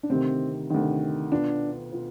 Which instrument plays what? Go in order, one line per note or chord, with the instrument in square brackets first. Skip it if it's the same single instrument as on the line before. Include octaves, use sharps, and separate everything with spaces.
[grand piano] D4
[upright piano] D2 C3 D#3 [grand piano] C4
[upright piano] D2 C3 D#3
[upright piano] B2 B3 F4 [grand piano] D4
[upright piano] B2 B3 F4